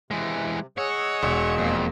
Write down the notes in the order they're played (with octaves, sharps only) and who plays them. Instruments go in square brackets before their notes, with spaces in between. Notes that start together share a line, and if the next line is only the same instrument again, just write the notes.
[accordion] C3 [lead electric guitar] E3 G#3
[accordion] G#4 D#5 E6 [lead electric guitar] C#5 [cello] F#5
[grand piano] E1
[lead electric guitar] F2 [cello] A#3